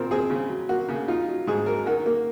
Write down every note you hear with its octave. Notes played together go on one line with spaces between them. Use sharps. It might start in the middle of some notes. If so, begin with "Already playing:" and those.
Already playing: A#2 C4 A#4
C4 G#4
C#3
F#3
A#3 F#4
C#3
D#4 F4
F#3
G#2 G#4
F#3 A#4
D#3 F#4
A#3